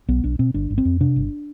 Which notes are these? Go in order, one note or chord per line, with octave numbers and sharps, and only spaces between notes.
B1 B3
B1 D4
B2 C4
G1 D4
G1
C4
F2
C3 D4
G1